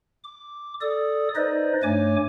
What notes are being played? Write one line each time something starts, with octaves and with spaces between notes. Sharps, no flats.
D6
A4 D5 D#6
D#4 B4 C5 D5 D#5
G2 A3 C#5 G#5 D6